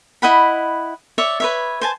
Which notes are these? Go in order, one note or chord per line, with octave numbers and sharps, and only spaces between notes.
E4 D#5 F#5 B5
C#5 D5 E5
B4 C#5 E5
C5 G#5 A5